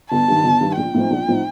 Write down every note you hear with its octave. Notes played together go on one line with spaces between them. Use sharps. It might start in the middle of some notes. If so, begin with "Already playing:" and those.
G1 A5
G2 D#3
G1
G2 D#3
A#1 G5
A2 F3 C4 D#4
A#1
A2 F3 C4 D#4